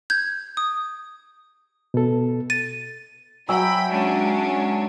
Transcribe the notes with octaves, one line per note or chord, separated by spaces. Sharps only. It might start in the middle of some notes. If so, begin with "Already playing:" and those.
G6 G#6
D#6
B2 A4
A6 D#7
F#3 E5 G5 G#5 B5
G#3 C#4 D4